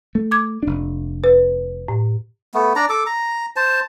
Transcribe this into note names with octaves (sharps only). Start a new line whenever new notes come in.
A3
D6 G#6
F1 D4
B4
A2
A3 B3
D4 D5 A#5
A4 D6
A#5
C5 A5